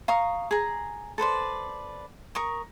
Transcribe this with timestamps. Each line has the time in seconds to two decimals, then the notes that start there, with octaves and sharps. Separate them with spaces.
0.08 F5 A#5 C#6 D#6
0.51 G#4 A#5
1.18 A4 B4 C5 D5
2.35 A#4 C#6 D#6